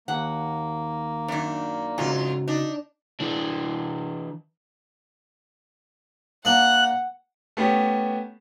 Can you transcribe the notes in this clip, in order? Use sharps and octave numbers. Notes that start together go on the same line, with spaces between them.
D#2 A#3 F#5
F#2 D#3 D4
F2 G#2 C#3 F4 F#4 G#5
D4 D#4
E3 D4
A#3 D4 F#5 F#6
A3 B3 C#4 G4